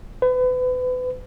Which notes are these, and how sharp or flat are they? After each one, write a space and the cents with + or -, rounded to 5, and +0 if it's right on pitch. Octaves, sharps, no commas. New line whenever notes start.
B4 +35